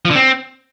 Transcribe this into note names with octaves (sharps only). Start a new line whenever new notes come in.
F3
D3
C4